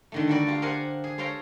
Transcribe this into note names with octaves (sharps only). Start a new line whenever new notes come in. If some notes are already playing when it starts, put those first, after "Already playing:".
D3 D#3 A3
G3 A3 F#4 A4 A#4 D5
F4 G4 F5
G4 A#4 C5 F5 F#5 G#5
G#4
A4 C5 C#5 F5 G5 A#5